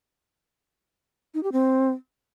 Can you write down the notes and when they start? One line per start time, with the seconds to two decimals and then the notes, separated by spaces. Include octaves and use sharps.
1.34 D#4
1.43 G4
1.52 C4